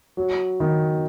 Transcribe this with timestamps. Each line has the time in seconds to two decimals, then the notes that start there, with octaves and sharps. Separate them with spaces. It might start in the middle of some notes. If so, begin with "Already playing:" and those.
0.17 F#3
0.60 D#3